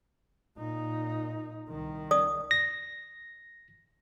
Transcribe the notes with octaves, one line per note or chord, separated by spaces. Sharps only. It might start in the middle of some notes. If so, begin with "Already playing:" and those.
A#2 D#4
C2 D#3
D5 D#6
A#6